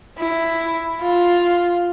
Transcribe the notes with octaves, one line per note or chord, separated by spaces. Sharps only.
E4
F4